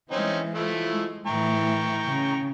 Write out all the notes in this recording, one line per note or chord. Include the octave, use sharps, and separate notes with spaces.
E3 G#3 C4 C#4 D#4
F3 A3 E4
G#3
A2 E3 G5 A#5 C#6
C#3